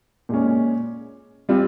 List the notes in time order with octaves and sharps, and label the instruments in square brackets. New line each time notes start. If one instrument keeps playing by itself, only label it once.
[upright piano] A#2 G#3 C#4
G3 C4 F4